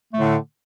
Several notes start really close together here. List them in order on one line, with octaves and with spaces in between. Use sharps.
A3 A2 D3